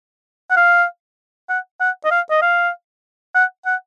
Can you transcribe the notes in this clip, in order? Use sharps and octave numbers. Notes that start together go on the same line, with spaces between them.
F#5
F5
F#5
F#5
D#5
F5
D#5
F5
F#5
F#5